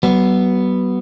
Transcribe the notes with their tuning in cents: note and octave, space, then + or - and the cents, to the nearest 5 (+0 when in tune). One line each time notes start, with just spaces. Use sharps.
F#3 +45 B3 +0